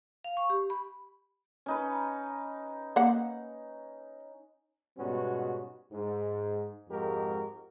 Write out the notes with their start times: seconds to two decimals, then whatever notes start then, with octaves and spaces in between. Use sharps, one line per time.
0.24 F5
0.37 C#6
0.50 G4
0.70 B5
1.66 C#4 D#4 B4
2.96 A#3 F#5
4.98 G#2 B2 G3 B3 C#4 F#4
5.91 G#2
6.89 F2 G#2 G#3 F#4 G4 A#4